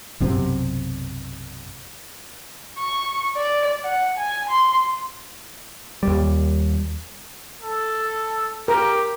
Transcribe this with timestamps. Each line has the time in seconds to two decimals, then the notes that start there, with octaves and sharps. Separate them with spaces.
0.20 B1 F#2 C3
2.78 C#6
3.37 D5
3.84 F#5
4.17 G#5
4.49 C6
6.03 D#2 G3
7.62 A4
8.68 G4 A#4